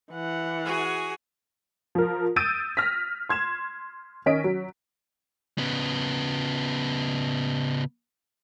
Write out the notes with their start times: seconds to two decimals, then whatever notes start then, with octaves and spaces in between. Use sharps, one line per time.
0.12 E3 F#5
0.64 F#4 G#4 G#5
1.95 F3 A#4
2.36 D#6 E6 G6 A6 D7 D#7
2.77 F6 A#6 B6
3.29 C6 G#6 E7
4.26 D#3 C#4 D#5 B6 D7
4.44 F#3
5.58 C#3 B3